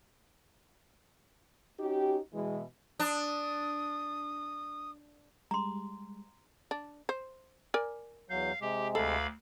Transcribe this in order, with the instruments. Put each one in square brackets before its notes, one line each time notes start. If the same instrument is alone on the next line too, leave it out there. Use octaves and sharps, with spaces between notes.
[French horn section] C#4 D#4 F#4 G4
B2 E3 G#3
[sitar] D4 [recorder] D#6
[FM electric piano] G3 G#3 [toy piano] A#5 C6
[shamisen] D4
C5
A#4 D5 G#5
[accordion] E2 F#3 G6 [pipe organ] F5
[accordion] C3 G#3 [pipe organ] G4
[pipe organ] D2 F5 B5 [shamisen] A4